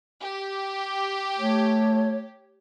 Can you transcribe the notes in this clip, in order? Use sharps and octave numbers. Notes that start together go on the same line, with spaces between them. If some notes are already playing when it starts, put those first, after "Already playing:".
G4
A3 C#5